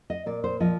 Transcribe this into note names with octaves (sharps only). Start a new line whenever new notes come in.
D#5
A#2 D5
C5
F3 D#5